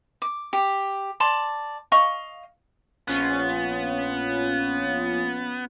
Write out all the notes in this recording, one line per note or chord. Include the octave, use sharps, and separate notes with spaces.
D6
G4
D5 A5 C6
D#5 F5 C#6
A#1 B3 C#4 F4